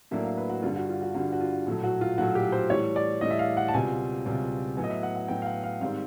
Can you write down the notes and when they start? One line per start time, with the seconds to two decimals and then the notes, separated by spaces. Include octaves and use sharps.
0.11 A2 F#3 A#3 D4 E5
0.24 F5
0.37 B4
0.49 F#4
0.63 G2 D3 G3 F4
0.76 F#4
0.89 F4
1.02 F#4
1.14 G2 D3 G3 F#4
1.33 F#4
1.41 F4
1.66 A#1 A2 F#3 A3
1.84 F#4
2.01 F4
2.18 A#1 A2 F#3 A3 F#4
2.35 G4
2.52 C5
2.70 A2 E3 G3 C#5
2.96 D5
3.21 A2 E3 G3 D#5
3.31 E5
3.39 F5
3.57 F#5
3.68 A5
3.74 C#2 B2 G3 C4 F4 G#5
4.26 C#2 B2 G3 C4 F4
4.77 A2 F#3 B3 G#5
4.84 D#5
4.90 E5
5.03 F#5
5.16 F#5
5.28 A2 F#3 B3 G5
5.42 F5
5.46 F#5
5.63 F5
5.81 G#2 D#3 G3 C4 F5